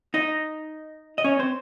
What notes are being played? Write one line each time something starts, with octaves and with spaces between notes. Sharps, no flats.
D#4 D#5
D#5
C#4 C#5
C4 C5